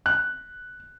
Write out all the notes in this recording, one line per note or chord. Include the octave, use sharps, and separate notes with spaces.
F#6